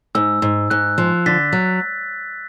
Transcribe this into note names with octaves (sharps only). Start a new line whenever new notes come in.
G#2 E6
G#2
G#2 F#6
F3
D3 A6 B6
F#3